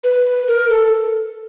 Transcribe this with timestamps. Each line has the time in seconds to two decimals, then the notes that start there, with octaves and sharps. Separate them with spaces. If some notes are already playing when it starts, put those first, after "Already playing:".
0.04 B4
0.48 A#4
0.69 A4